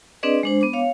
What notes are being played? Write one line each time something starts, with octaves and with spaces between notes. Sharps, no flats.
C4 D4 G#4 B4 D5 D#5
G#3 D4 C5
B3 D6
C#5 F5